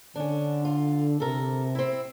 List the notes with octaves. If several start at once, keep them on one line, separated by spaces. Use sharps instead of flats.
D3 C#4 D4
F4
C3 A4 A#4
C4 E4